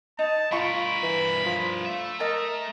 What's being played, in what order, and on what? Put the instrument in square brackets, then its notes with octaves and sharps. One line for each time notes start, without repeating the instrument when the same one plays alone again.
[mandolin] D#4 [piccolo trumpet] A5
[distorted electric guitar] G2 A#4 [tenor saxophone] F4 [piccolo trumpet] B5 [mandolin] C#6
[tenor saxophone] E3
F3
[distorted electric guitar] A3 E5
[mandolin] A4 D#5 [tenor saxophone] A#4 [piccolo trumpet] A#5